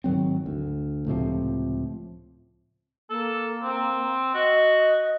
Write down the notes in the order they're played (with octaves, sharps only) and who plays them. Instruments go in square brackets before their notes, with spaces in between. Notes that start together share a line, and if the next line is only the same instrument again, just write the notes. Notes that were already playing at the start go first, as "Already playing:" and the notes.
[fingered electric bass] G#2 D#3 F#3 C4
D2
C#2 A2 C3 F3
[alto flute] A#3 [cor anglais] A4
[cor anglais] C4
[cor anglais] F#4 [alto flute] D#5